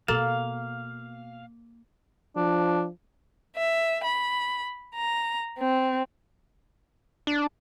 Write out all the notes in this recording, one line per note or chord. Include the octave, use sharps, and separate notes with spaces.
B2 A#3 B3 A4 F5 A6 E7
F3 D4
E5
B5
A#5
C4
D4